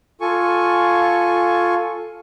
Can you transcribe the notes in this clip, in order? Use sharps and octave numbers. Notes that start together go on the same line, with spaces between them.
F4 A4 G#5 C#6